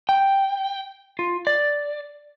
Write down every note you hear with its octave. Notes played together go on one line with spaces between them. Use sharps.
G5
F4
D5